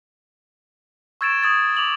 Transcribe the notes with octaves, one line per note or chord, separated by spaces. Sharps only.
C#6 E6 G#6 A6 D7 E7
D#6 G#6 A6
D6 F7 F#7